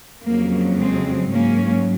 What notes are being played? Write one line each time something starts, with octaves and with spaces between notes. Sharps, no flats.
F2 C#3 F#3 A#3
G#3 C4
G#2 F#3 A#3 C#4